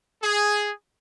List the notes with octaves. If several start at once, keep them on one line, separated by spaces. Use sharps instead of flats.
G#4